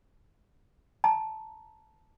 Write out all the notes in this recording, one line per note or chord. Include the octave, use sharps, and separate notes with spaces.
A5 A#5